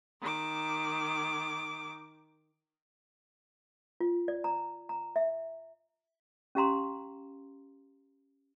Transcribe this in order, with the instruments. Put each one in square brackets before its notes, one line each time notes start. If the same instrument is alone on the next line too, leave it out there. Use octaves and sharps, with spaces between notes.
[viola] D#3 D6
[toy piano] F4
D5
A#5
A#5
E5
C#4 G4 F5 A#5 C6